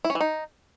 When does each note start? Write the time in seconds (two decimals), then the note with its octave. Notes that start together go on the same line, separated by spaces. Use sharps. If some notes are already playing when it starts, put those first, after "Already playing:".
0.05 E4
0.10 C#4
0.15 E3
0.21 D#4